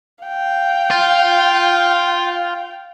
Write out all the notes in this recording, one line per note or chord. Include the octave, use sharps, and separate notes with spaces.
F5 G5
F4